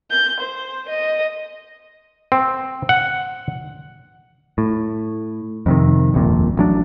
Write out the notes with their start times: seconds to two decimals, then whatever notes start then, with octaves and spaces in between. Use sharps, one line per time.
0.11 G6
0.40 C5
0.89 D#5
2.32 C4
2.89 F#5
4.58 A2
5.66 F2 C3 D#3
6.14 D#1 A#1 F2 A#2
6.57 A1 F#3 D4